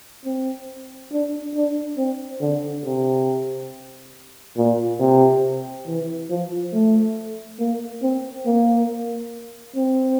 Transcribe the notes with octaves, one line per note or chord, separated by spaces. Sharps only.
C4
D4
D4
C4
D3
C3
A#2
C3
E3
F3
A3
A#3
C4
A#3
C4